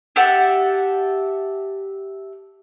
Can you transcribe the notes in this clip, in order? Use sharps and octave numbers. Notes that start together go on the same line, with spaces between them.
G4 A4 E5 F#5